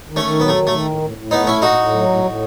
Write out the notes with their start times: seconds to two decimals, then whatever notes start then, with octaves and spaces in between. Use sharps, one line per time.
0.09 D#3
0.16 A3 C#4
0.24 D#3
0.39 F#3 B3
0.48 A3
0.55 D#3
0.67 D#3 A3
0.85 A2
1.01 A2
1.17 A2
1.31 A3 B3 D#4
1.47 A2 C#4 E4
1.62 A2 D#4 F#4
1.78 A2
1.93 F#3
2.09 A2
2.24 A2